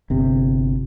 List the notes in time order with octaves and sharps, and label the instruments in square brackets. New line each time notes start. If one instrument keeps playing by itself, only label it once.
[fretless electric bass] G1 C3